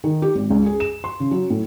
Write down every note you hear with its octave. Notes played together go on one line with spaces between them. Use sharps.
D#3
G4
G#1
C#2
G#4
E7
C6
C#3
F#3
A2